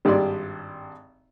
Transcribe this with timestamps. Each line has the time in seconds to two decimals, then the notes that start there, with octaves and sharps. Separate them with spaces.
0.05 G#1 G2 G4 D5 C6